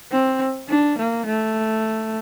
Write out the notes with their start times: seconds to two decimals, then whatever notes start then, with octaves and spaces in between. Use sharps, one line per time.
0.12 C4
0.69 D4
0.98 A#3
1.26 A3